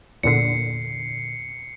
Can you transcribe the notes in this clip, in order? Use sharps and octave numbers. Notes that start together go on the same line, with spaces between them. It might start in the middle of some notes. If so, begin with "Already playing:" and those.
E2 A#2 D3 C7 C#7